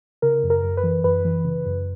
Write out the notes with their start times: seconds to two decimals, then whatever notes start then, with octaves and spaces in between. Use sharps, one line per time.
0.22 C#3 A#4
0.43 F#2
0.50 A#4
0.63 F#2
0.77 B4
0.83 E3
1.04 F#2 B4
1.25 E3
1.45 C#3
1.66 F#2